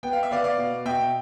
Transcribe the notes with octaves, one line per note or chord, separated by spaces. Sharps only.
B3 G5
F5
E5
B3 D5 F5
D5 F5
B2
B2 E5 G5